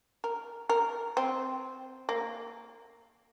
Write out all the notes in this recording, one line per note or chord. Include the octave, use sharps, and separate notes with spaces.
A#4
A#4
C4
A#3